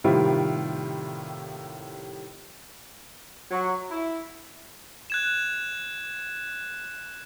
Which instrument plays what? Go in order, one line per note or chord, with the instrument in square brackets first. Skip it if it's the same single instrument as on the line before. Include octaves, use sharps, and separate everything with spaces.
[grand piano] A2 C3 D#3 G3 E4 F4
[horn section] F#3
E4
[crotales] F#6 G#6 E7